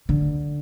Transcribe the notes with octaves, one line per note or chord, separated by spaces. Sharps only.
D3